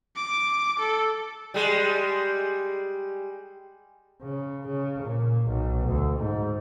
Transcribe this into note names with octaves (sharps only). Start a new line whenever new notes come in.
D6
A4
G3 G#3
C#3
C#3
A#2
B1
D2
G#2